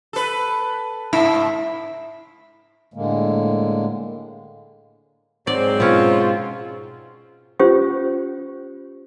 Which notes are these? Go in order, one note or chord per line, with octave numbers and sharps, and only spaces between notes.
A4 B4
G#2 E4
A2 D3 G#3 A#3
G#2 F#3 C4 D5
B2 C#4 F4
C#4 F4 G4 C5 C#6